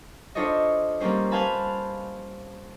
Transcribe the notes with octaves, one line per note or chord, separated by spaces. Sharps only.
D4 F4 A4 C5 C#5 D#5
G3 A#3 C4 C#4 C5
B4 C5 F5 G#5 A5 B5